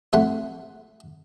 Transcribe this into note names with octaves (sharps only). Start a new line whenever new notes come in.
A1 F2 A3 F#5 C6